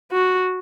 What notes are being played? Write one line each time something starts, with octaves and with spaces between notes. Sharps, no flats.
F#4